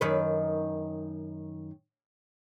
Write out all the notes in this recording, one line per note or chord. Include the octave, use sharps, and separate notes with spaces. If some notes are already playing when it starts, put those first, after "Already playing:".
F#2 D#3 B4